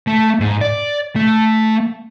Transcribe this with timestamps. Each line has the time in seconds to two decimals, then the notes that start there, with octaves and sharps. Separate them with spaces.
0.07 A3
0.40 G#2
0.61 D5
1.16 A3